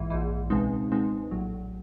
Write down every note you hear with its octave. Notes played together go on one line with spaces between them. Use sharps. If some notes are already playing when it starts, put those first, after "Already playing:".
Already playing: A#1 G#2 E3
A#1 G#2 E3
C#2 B2 G#3 C4 D#4
C#2 B2 G#3 C4 D#4
A#1 A2 F#3